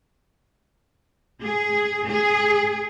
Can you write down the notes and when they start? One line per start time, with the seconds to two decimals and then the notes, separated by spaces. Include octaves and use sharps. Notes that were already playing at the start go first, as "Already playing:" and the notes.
1.43 G#4
2.09 G#4